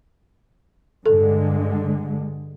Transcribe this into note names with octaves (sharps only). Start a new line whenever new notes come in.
G2 D3 G#3 A4